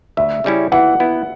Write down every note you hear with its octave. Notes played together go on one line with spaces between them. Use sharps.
D2 E5
C#3 G3 C#4 E4
E3 F#5
B3 E4